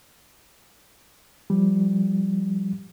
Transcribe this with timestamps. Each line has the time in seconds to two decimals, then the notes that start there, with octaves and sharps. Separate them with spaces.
1.50 F3 G3